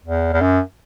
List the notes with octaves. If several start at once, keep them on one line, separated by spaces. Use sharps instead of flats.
E2
E2
F#2